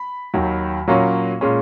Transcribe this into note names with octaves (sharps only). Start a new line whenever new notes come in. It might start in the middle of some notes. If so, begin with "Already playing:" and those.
Already playing: B5
D#2 D#3 F#3
A#2 F#3 A#3 C#4
A#2 G#3 C#4